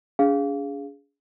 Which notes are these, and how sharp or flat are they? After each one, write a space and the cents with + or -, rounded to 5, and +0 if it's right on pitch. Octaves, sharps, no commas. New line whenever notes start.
D4 -45 G#4 +0 F5 +0